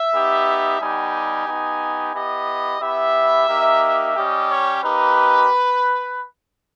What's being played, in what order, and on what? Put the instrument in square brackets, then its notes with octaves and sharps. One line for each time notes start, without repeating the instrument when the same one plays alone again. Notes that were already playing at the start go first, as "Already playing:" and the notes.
Already playing: [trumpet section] E5
B3 D#4 G4
G3 B3 D#4 G4 G#5
B3 D#4 G4
B3 E4 G4 D#5
B3 E4 G4 E5
A#3 D#4 G4
G3 C#4 G4 D#5
C#5
A#3 D#4 G4 B4